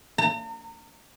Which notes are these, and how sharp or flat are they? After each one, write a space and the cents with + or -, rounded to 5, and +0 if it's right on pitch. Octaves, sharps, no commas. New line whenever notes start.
A#5 -45